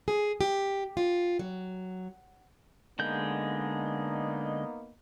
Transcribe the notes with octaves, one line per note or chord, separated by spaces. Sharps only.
G#4
G4
F4
F#3
D3 G#3 A#3 B3 D#4 G6